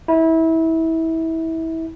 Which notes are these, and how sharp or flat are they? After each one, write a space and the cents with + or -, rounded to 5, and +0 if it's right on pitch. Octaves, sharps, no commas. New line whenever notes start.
E4 -25